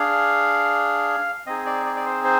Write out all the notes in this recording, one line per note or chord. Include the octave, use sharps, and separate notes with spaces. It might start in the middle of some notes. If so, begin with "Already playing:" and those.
Already playing: D4 G#4 F5
C4 D#4 G#4 D#5
D5
D5
D5
C5
C5